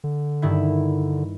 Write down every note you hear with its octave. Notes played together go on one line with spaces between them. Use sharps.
D3
G2 D#3 E4